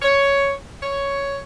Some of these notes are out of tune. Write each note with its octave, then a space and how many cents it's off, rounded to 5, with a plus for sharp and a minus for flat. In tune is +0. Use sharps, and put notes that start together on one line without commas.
C#5 +5
C#5 +5